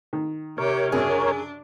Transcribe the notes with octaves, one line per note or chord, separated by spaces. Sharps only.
D#3
C3 G4 A#4 C#5
F#2 C#3 F#3 D4 G#4